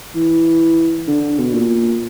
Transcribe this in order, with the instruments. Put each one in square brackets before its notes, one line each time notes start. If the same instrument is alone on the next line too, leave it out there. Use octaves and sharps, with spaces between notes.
[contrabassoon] E3
D3
B2
A#2